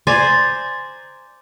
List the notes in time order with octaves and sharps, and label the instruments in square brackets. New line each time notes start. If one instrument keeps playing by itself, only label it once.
[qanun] C5 D5 G#5 A#5